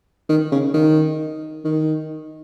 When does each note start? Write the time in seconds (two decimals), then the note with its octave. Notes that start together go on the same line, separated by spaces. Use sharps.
0.29 D#3
0.52 C#3
0.74 D#3
1.65 D#3